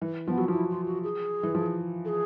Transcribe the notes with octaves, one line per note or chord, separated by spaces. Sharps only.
E3
F3 B3
F#3
F3 E4
F4
F#4
G#4
E3
F3
A4
G#4